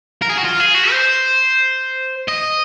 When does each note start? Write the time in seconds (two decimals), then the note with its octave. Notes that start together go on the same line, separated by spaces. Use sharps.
0.22 A#4
0.29 G#4
0.37 F#4
0.44 F4
0.60 G#4
0.74 F#4
0.90 C5
2.28 D#5